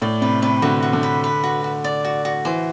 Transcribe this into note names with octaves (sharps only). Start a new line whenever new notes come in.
A2 D5
C3 B4
C3 B4
D3 F#4
F#4
D3
B4
B4
F#4
F#4
D5
F#4
F#4
E3 C5